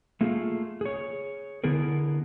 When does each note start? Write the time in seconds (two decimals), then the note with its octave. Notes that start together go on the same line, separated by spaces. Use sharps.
0.21 A3 A#3 F4 G#4
0.81 G#4 C#5
1.64 D3 B3 E4 G#4 A#4